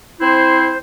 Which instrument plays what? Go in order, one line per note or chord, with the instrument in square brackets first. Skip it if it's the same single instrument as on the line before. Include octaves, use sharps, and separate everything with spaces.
[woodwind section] C4 E4 C5